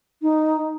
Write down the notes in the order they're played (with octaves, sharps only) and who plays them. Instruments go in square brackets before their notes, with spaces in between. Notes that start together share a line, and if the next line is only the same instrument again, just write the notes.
[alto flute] D#4